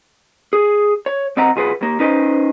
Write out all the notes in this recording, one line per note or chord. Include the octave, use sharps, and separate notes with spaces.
G#4
C#5
C2 C4 D#5 F#5 A#5
B1 F4 G#4 B4 F#5
D#2 A#3
C#4 D#4 B4 C5 D#5